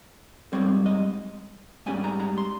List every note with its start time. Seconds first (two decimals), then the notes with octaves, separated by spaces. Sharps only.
0.53 G#2 G3 C4 C#5
0.86 D#5
1.86 G#2 G3 C#4 G#5
2.04 A#5
2.20 A#5
2.38 C6